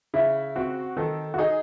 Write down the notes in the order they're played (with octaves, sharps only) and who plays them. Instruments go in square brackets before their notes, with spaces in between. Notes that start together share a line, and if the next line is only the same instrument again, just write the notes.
[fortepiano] C#3 [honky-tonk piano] E4
[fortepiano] C4 [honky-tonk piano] F#4
[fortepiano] D#3 [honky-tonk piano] A4
[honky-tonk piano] F#4
[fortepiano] D#4 [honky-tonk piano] G#4